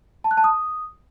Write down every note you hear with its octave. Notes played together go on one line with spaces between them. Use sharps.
A5
F#6
A5
D#6